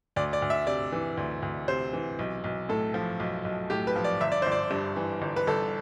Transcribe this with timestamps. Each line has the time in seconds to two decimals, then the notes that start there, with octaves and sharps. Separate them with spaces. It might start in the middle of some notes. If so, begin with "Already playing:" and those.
0.16 D2 D5
0.33 D5
0.42 D2
0.50 E5
0.67 C3 D5
0.92 E3
1.17 D2
1.42 D2
1.68 C3 C5
1.93 E3
2.19 B1
2.44 B1
2.69 A2 A4
2.94 F3
3.20 B1
3.45 B1
3.70 A2 G4
3.87 B4
3.96 F3
4.04 D5
4.21 G1 E5
4.32 D5
4.42 G1 C5
4.52 D5
4.71 G2
4.96 E3
5.22 G1
5.36 B4
5.47 G1 A4